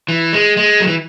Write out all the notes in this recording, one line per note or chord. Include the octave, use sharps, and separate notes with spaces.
E3
G#3
G#3
F#3
E3